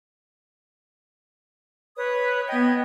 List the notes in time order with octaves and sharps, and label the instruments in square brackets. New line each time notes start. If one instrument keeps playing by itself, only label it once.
[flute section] B4 C#5 D#6
[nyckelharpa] B3 G5 [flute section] D#5 F#6 G#6